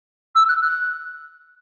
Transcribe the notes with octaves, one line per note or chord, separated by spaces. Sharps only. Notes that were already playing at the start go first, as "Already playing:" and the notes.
E6
F#6
F#6